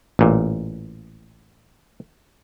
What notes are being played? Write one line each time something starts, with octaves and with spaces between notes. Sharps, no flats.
A1 A#2